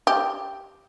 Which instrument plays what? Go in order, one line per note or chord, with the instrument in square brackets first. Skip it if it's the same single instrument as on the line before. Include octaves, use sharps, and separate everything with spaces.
[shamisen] G4